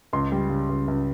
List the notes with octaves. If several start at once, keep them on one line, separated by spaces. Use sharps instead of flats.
C#2 C6
G3
C#3
C#2
C#2